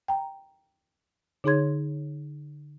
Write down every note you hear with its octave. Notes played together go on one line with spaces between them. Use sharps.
G5 A#5
D3 D#4 G#4 C#5 C6 G#6